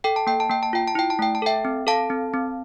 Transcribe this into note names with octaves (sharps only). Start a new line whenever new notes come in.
A4 G5
A5
A#3 G5
A5
A#3 G5
A5
F4 G5
A5
E4 G5
A5
A3 G5
A5
A4 E5 G5
C4
A4 F5 A5
C4
C4